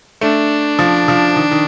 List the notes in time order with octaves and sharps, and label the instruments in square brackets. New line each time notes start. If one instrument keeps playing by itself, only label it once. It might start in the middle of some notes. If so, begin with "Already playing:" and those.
[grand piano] A3 [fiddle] D4
[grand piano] F3
F3
D#3
D#3